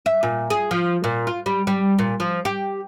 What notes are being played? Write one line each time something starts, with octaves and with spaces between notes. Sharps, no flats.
E5
A#2
G#4
F3
A#2
F4
G3
G3
A#2
F3
G4